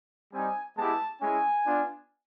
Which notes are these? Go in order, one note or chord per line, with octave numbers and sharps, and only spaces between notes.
G3 C4 D#4 G#5
G#3 B3 E4 G4 A5
G#3 C#4 E4 G#5
B3 D4 F4